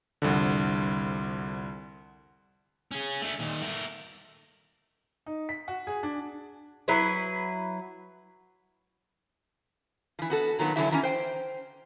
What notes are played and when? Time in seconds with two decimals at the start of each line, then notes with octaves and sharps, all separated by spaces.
0.22 C2 F2 D3
2.91 C#4 G#4
3.22 A3 D4
3.39 A#2 D#3
3.61 A3 A#4
5.26 D#4
5.49 B6
5.68 F#4
5.87 G#4
6.03 D4
6.88 F#3 E4 B4
10.19 E3 F3
10.30 B3 F#4 A4
10.58 A#2 D#3 F#3 A3 B3
10.76 D3 E3 F#3 E4 G4 E5
10.91 D#3 E3 C#4
11.03 C5 G5